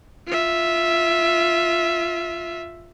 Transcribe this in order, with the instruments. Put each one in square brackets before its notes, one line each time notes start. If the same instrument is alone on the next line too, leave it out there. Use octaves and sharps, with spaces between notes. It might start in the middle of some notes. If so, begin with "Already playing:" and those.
[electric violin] F4 E5